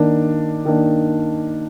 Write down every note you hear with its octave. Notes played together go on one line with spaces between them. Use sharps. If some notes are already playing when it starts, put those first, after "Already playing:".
Already playing: D#3 A#3 D4
D#3 A#3 D4